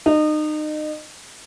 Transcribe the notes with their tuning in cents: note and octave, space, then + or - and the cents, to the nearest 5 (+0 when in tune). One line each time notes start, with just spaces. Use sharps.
D#4 -30